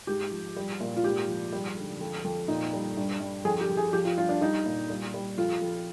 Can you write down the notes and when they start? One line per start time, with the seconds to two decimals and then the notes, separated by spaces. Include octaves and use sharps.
0.07 G#2 G4
0.31 F3
0.57 G3
0.80 A#2
0.96 F4
1.04 G#2 G4
1.28 F3
1.53 G3
1.77 D3
2.00 F2
2.24 F2
2.48 A#2 D#4
2.73 G3
2.97 G2
3.20 G2
3.45 F2 G#4
3.61 G4
3.69 F2
3.77 G#4
3.93 F3 G4
4.05 F4
4.17 G2 F4
4.29 D4
4.41 G3 D#4
4.66 A#2
4.90 G3
5.14 G3
5.38 F2 F4
5.61 F2